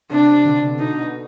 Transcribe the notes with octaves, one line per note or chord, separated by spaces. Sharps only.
C3 D4
B2 D3
B2 D3 D#4
B2 D3